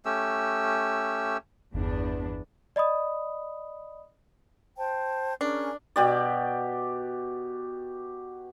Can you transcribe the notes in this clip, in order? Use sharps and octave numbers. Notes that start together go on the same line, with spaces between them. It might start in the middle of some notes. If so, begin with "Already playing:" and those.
A3 C#4 G4 E6
G1 E2 B3 D4
D5 D#5 B5 D#6
C5 G5 A5
C#4 D4 G#4 A#4
B2 G4 D5